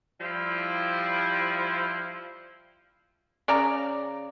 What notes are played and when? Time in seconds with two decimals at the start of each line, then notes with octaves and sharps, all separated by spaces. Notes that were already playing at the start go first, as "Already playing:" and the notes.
0.21 F3 G3 E4
3.48 C#3 D5 A#5